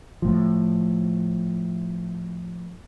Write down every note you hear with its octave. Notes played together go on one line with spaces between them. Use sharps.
A2 F3